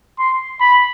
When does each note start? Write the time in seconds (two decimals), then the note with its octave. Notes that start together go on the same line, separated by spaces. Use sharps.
0.19 C6
0.61 B5